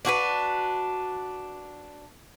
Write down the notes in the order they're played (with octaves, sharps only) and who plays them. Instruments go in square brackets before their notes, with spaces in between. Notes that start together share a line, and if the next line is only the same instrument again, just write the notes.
[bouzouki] D4 F#4 G#4 B4